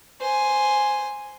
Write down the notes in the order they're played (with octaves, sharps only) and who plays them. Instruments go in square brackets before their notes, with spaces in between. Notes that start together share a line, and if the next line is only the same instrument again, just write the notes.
[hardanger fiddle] C5 G#5